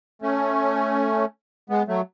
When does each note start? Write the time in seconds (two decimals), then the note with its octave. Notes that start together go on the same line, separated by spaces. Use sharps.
0.22 A3 C#4
1.70 G#3 B3
1.88 F#3 A3